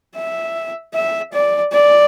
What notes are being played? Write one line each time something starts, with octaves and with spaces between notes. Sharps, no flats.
E5
E5
D5
D5